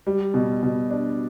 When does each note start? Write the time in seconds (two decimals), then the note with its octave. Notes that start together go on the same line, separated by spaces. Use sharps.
0.07 G3
0.34 B2
0.63 B2
0.90 D4